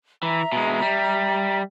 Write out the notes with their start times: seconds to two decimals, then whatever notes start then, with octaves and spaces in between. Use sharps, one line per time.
0.23 E3 E5 A#5
0.52 B2 G#3
0.82 G3